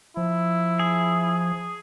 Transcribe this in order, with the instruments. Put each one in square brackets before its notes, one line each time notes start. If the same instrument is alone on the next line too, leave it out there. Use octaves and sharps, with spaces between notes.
[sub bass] F3 [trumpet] E4
[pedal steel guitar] G#4